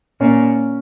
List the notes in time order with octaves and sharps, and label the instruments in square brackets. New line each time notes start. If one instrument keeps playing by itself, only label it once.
[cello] A#2 [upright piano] C#4